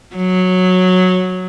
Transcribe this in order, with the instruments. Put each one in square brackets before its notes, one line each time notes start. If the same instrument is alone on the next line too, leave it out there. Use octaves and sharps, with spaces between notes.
[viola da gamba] F#3